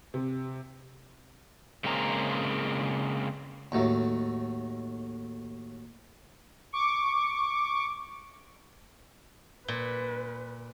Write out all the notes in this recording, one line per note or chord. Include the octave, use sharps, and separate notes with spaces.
C3
C#3 G#3 A#3 C4 G#4 A#5
D#2 A2 F#3
C#6 D6
A#2 B4